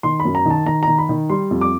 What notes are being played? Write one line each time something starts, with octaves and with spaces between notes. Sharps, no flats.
D#3 C6
B5
F#2
A#5
D#3 A5
D#3 A#5
D#3 A#5
B5
D#3
G3 C6
F2
D6